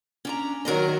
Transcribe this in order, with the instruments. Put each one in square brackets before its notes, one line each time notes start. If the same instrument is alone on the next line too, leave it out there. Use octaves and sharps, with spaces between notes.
[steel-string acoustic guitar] C#4 D4 A#5
[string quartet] D#3 F#3 [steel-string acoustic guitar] A#4 D5 D#5